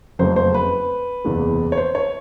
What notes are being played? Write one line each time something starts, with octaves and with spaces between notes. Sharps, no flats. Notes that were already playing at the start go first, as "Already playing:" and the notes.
F#1 F2 C#3 F#3 A3 C5
C5
B4
F#1 E2 C3 E3 G#3
C#5
C5
C#5